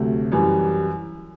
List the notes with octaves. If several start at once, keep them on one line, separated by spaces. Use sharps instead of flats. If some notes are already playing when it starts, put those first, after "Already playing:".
Already playing: D2 C3 F#3 A3
F#2 E3 G3